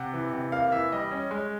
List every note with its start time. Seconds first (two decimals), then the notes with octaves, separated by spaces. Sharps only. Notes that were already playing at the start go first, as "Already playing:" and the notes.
Already playing: C3 F#5
0.13 E3
0.33 C3
0.52 A#3 F5
0.72 E3 E5
0.92 G3 D#5
1.11 C#4
1.31 G#3